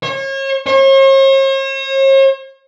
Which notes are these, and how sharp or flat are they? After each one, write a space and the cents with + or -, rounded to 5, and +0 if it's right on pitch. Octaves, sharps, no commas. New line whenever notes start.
C#5 -35
C#5 -45